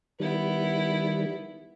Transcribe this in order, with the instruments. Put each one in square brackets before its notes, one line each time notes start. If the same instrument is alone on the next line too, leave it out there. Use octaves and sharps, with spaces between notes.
[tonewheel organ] D#3 G3 [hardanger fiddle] B3 E4